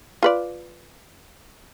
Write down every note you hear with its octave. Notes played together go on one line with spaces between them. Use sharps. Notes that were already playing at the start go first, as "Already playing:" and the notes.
F4 B4 D5